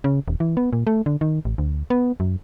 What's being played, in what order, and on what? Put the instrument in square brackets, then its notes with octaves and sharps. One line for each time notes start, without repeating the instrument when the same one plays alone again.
[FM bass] C#3
D#1
E3
B3
A#2
A3
D3
D#3
A1
D2
B3
F#2